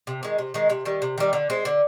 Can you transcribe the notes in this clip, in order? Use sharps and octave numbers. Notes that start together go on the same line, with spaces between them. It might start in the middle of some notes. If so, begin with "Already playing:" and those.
C3
D#3 G#3
C3
D#3 G#3
C3
D#3 G3
C3
D#3 G3
D3
G#3 C4
D3